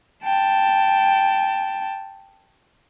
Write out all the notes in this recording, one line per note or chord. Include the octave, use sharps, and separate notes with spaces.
G5 A5